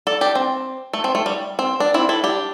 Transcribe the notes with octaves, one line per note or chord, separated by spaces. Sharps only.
A4 D5
D4 G4
C4
A3
C4
A3
G3
C4
D4
C4 E4
E4 A4
D4 G4